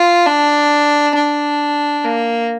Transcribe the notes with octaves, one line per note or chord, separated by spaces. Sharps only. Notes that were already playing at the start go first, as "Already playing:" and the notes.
Already playing: F4
D4
D4
A#3